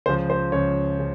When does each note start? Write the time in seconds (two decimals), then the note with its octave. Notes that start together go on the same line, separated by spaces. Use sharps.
0.06 C#2 C#3 F3 C5
0.30 C5
0.52 C#2 C#3 F3 C#5
0.99 C#3